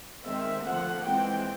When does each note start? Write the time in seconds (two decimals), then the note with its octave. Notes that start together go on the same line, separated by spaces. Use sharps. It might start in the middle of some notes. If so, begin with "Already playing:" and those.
0.24 D#3 G#3 C4 E5
0.65 D3 F3 A3 F#5
1.04 E3 G#3 C4 G5